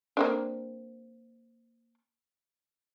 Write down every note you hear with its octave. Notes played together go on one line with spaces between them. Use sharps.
A#3 C4 D4